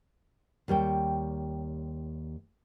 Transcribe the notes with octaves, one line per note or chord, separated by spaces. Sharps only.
D#2 G3 C#5 G5